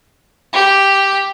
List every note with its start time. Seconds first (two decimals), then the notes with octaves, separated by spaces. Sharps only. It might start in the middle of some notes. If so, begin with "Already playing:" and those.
0.53 G4